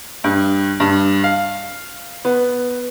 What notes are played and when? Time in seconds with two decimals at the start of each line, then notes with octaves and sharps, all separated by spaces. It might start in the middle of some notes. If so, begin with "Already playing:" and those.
0.24 G2
0.80 G2
1.24 F5
2.25 B3